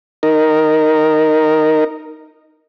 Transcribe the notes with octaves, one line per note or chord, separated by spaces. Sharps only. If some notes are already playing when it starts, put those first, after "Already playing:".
D#4 A#4